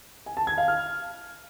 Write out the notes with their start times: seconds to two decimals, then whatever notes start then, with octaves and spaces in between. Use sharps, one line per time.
0.26 G#5
0.37 A5
0.47 G#6
0.58 F5
0.68 F6